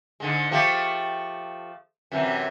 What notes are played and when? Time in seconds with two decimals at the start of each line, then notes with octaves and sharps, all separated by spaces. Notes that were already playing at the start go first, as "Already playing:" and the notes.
0.20 G#2 D3 G#3
0.51 F3 A3 G4
2.12 F#2 C3 E3